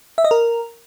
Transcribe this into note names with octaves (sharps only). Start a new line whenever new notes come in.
E5
D#5
A#4